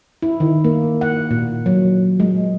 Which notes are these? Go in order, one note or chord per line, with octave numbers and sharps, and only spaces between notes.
E4
D#3
A#3
F#5
A#2
F#3
G#3